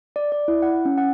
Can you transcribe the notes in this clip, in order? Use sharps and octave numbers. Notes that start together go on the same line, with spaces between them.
D5
D5
E4
F#5
C#4
F#5